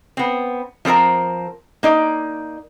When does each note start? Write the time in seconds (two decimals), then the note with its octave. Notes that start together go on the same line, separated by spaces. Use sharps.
0.17 B3 C4
0.85 F3 C4 A4 A#4 C5
1.83 A#3 D#4 D5